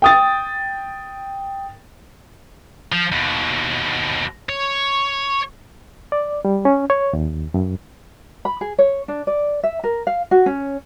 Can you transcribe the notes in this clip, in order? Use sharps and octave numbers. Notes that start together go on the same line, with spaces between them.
G5 D#6 A6
F3
D#2 B2
C#5
D5
G3
C#4
C#5
D#2
F#2
B5
G#4
C#5
D4
D5
E5
A#4
F5
F#4
C#4